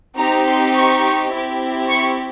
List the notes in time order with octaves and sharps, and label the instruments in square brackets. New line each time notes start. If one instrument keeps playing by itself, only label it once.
[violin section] C4 D#4 G4 A#5
C6
C#6
C4 E4 G4
C#6